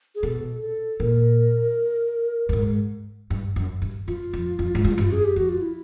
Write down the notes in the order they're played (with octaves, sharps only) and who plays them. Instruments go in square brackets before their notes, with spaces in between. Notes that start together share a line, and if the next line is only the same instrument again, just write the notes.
[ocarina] G#4
[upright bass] B2 [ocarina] A4
[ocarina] A4
[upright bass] A#2 [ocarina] A#4
[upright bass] A2
G#2
G2
F#2
G2
[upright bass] F#2 [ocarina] F4
[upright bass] F2
F2
G#2
G2
G2
[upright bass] F#2 [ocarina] G#4
[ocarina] G4
[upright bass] F2 [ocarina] F#4
[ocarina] F4
E4